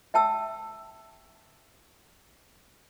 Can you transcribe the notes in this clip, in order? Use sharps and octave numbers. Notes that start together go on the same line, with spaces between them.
E5 G5 A5 E6